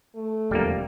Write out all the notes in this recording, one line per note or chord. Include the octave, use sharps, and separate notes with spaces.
A3
E1 F2 D3 G3 A#3